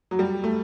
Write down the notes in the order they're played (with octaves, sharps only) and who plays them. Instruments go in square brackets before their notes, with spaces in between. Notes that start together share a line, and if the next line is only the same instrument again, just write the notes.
[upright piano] F#3
G3
A3